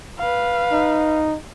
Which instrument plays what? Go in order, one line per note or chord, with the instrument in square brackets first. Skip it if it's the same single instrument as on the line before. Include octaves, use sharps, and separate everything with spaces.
[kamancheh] B4 F5
[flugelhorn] D#4